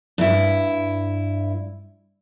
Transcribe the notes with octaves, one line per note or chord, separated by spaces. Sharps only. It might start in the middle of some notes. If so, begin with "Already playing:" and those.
G2 E4